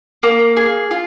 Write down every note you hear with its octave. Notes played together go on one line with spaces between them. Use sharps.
A#3
G#4
F4